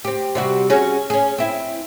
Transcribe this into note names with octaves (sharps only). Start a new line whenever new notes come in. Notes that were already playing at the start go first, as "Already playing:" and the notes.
C4 G4
C3 G3 F#4
C#4 F#4 G#4
C#4 G#4
C4 E4